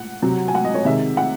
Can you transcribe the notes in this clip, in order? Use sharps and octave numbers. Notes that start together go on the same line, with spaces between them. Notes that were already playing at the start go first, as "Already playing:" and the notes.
Already playing: F#5
C3 F#3 C4
G#5
F#5
D#5
C#5
C3 D#3 G#3 E5
F#5